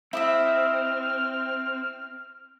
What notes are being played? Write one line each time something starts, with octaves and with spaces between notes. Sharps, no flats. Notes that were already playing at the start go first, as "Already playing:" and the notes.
C4 E4 D#5 E5 F6